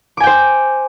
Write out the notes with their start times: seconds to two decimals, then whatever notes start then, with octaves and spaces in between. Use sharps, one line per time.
0.17 D6
0.20 G#5
0.24 G5
0.27 C5